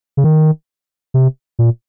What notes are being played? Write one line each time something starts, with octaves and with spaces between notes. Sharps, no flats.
C#3
D#3
C3
A#2